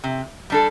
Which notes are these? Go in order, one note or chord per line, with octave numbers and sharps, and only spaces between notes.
C3
G3 D4 A4